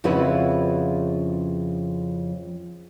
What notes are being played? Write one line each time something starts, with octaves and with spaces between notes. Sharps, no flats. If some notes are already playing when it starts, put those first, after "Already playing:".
F2 C#3 F3 E4 F#4 B4